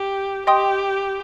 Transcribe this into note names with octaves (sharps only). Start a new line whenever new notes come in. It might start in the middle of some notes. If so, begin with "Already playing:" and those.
Already playing: G4
G4 D#5 G5 C6 D#6